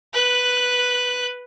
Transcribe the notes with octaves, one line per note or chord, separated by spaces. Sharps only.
B4 F#6